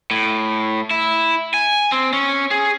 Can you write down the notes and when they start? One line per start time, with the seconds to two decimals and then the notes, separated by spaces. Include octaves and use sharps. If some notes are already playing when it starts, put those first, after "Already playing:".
0.11 A2
0.91 E4
1.54 G#5
1.92 C4
2.13 C#4
2.51 G#4